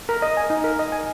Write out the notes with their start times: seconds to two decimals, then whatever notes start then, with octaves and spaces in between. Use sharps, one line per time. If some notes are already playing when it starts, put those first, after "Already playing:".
0.09 A#4
0.22 D#5
0.37 G#5
0.50 D#4
0.64 A#4
0.79 D#5
0.92 G#5